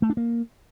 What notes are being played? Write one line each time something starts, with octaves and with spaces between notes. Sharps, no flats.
A3
D4
A#3